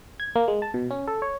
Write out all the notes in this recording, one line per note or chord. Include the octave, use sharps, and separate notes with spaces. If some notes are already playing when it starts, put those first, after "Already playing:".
G#6
A#3
G#3
A5
B2
C#4
A4
C#5